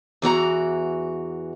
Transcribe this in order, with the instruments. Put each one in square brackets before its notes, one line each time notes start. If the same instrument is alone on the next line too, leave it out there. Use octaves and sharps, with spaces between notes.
[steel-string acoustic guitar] E2 E3 F#4 A#5